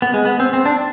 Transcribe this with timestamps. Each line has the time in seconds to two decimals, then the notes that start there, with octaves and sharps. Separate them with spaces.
0.02 B3
0.14 G#3
0.25 B3
0.40 C4
0.53 C4
0.65 D4